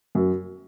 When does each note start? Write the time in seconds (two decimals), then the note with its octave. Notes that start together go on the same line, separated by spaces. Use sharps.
0.15 F#2